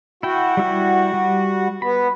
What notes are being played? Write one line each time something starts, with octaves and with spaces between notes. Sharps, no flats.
E4 F#4 G5
G3 E4 G4
G3
B3 B5